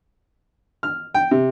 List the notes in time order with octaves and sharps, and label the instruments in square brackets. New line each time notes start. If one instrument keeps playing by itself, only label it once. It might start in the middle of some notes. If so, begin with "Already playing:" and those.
[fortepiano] F6
G5
C3